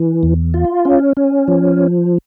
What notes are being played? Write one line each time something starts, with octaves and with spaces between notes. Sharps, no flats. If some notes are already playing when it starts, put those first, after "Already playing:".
Already playing: E3
E2
F4
C#4
C#4
F3